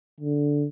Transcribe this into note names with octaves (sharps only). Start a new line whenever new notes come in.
D3